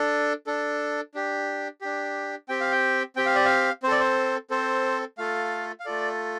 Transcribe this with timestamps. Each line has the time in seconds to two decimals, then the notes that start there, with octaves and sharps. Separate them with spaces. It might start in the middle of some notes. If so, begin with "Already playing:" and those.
Already playing: D4 A4
0.47 D4 A4
1.14 D4 G4
1.81 D4 G4
2.49 C4 G4 G5
2.61 F5
2.72 G5
3.16 C4 G4 G5
3.26 F5
3.36 D5
3.45 F5
3.83 C4 C5
3.88 A4 D5
4.00 C5
4.50 C4 A4 C5
5.18 A3 F4 A4 F5
5.80 F5
5.86 A3 F4 A4 D5